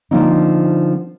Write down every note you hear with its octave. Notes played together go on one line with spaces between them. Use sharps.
D3 F3 A#3 C4 D#4